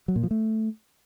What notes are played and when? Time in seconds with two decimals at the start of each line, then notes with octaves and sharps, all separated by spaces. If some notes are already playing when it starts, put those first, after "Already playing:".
0.08 F#3
0.16 A#2
0.23 F3
0.31 A3